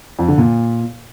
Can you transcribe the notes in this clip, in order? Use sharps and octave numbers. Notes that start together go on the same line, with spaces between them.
F2
D3
A#2